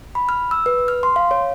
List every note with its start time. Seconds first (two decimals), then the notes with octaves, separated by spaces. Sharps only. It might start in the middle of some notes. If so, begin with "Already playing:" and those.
0.15 B5
0.29 F6
0.51 E6
0.66 B4
0.88 F6
1.03 C6
1.16 F5
1.31 C#5